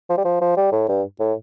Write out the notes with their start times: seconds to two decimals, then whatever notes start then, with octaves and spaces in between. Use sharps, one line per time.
0.10 F3
0.17 G3
0.24 F3
0.41 F3
0.57 G3
0.72 A2
0.88 G2
1.19 A2